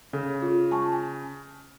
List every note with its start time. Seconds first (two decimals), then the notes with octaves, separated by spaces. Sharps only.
0.13 C#3 A4
0.42 F4
0.71 G#5 A5 C#6
0.92 G#5